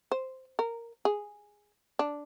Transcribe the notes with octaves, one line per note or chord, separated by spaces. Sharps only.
C5
A#4
G#4
D4